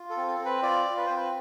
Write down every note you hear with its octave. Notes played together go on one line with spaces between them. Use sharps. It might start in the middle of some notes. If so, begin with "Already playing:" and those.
Already playing: F4
A4
C4
A4
C4
B4
F4 D5
F4
B4
C4 C5
B4